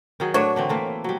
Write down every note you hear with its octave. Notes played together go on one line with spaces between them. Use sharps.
D#3 F#3 G#4
A2 F#3 D4 C#5
D3 E3 C4
E3 A3 A#3
F#3 G3